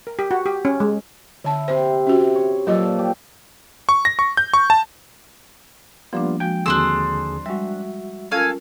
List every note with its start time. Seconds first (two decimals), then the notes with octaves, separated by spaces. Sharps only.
0.07 A#4
0.19 G4
0.31 F#4
0.46 G4
0.65 C#4
0.80 G#3
1.44 D3 E4 A5
1.68 C3 C5 C6
2.07 C#4 F#4
2.35 C#5
2.67 A#2 F3 F#3 F4 A4 D#5
2.99 G4
3.89 C#6
4.05 A#6
4.19 C#6
4.37 G6
4.54 C#6
4.70 A5
6.13 F3 G3 A#3 B3 D4 F4
6.40 F3 G#3 F#4 G5
6.66 D#2 D3 C4 D4 F#4 G#4 C5 E6
7.46 G3 G#3 F#4 E5
8.31 C#4 F4 A4 A#4 F5 G#5